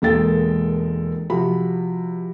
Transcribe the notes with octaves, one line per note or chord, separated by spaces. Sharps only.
E1 G#3 A#3 A4 G5 A6
C3 F3 F#4 B5